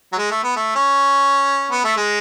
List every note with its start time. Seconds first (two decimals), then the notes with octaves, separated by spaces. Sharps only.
0.13 F#3
0.18 G#3
0.31 A3
0.44 B3
0.56 A3
0.76 C#4
1.71 B3
1.84 A3
1.97 G#3